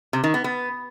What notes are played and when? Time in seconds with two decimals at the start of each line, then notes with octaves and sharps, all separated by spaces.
0.13 C3
0.24 D#3
0.34 B3
0.44 B3